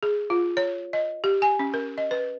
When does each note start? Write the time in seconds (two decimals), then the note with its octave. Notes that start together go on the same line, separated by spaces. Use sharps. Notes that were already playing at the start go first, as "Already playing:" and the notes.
0.03 G#4
0.30 F4
0.57 C#5
0.93 D#5
1.24 G4
1.42 G#5
1.59 C#4
1.74 A#4
1.98 D#5
2.11 B4